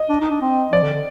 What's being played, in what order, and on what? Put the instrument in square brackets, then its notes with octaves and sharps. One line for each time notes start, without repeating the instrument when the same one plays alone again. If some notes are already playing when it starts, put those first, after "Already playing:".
Already playing: [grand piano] D#5
[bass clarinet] D4
D#4
D4
C4
[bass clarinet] F3 [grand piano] D5
[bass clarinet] D3
D3